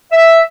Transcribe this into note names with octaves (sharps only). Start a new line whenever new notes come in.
E5